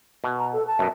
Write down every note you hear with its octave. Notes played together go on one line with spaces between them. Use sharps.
B2
A#5
A4
A5
F#2 B2